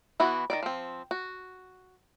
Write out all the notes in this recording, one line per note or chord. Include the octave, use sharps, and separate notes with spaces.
E3 B3 E4 F#4
D#3 E3 D5
F3 C4
F#4